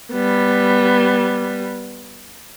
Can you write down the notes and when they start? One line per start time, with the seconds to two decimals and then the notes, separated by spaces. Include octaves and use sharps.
0.12 G3 B3